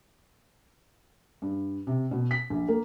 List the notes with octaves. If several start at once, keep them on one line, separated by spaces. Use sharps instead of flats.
G2
C3
B2
B6
A#1
A#3